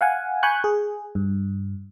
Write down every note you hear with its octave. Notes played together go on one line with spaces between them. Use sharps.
F5 F#5 G#5
G#5 B5 C#6 F#6 G6
G#4
G2